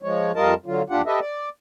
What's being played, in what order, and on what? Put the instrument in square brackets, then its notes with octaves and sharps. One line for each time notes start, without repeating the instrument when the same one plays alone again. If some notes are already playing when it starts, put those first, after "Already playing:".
[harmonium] F3 G#3 C#5
F2 G3 F4 A#4 D#5 A5
D3 F#3 F4
D#2 D4 F4 G4 F#5
G4 A4 B4 D#5 E5
D5